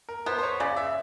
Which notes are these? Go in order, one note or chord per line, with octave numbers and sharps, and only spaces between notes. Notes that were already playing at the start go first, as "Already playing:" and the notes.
A#4
B3 C5
C5
C#5
C#3 D5
E5